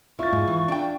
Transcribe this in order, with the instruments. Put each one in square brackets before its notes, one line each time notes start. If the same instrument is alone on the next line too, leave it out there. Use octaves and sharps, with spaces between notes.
[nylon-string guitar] E4 [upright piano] F4 A6 [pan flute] C#6
[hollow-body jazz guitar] G#2
E3
D4 G5